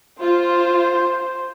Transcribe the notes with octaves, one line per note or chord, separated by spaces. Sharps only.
F4 C5